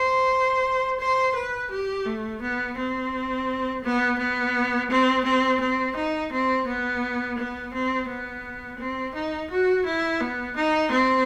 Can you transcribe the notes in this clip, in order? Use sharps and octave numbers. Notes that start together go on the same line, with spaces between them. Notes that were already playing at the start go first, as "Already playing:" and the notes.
Already playing: C5
C5
B4
G4
A3
B3
C4
B3
B3
C4
C4
C4
D#4
C4
B3
B3
C4
B3
C4
D#4
F#4
E4
B3
D#4
C4